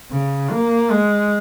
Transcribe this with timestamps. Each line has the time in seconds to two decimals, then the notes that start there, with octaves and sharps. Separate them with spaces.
0.12 C#3
0.51 A#3
0.91 G#3